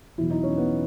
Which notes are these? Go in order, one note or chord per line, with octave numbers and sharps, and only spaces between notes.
E2 B2 F#3 E4
D#4
C#4
B3